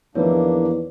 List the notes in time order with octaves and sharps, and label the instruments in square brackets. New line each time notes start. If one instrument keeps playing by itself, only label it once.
[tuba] E2 [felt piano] D#3 F3 E4 [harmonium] A#3 D4 [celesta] B4 C#5